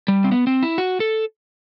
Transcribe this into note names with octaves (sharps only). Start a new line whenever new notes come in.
G3
C4
B3
C4
E4
F#4
A4